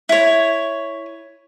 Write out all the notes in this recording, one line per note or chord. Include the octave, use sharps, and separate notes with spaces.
E4 C#5